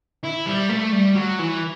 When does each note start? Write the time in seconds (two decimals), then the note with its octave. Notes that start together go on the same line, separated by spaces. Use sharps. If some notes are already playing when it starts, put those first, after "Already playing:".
0.24 E4
0.47 G3
0.70 A3
0.93 G3
1.15 F#3
1.39 E3